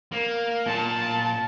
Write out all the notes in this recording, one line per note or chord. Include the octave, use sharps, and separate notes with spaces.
A#3
A#2 A5